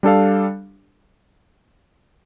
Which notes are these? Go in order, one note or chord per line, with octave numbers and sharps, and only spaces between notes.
G3 D4 A4 F5